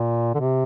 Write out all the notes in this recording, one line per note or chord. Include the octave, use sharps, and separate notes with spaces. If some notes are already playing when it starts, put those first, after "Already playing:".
Already playing: A#2
D3
C3